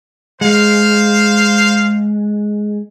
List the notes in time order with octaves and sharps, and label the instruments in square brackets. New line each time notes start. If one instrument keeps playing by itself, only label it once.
[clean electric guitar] G#3 [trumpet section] C5 F5